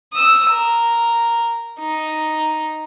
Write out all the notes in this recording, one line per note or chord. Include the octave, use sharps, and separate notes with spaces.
D#6 E6
A#4
D#4